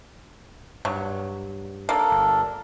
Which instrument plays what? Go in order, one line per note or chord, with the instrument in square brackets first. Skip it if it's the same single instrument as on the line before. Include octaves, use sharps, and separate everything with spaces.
[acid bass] G2 [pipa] F#3
[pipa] A#3 [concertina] D4 A4 A#4
[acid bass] G1